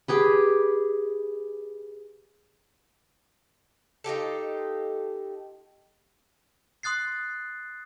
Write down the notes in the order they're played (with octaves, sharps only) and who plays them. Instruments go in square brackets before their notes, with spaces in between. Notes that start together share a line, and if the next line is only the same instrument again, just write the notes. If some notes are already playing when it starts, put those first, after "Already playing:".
[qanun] G4 G#4 B4
[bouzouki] D#4 F4 G4 A4
[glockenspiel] C6 D#6 F#6 A6 C7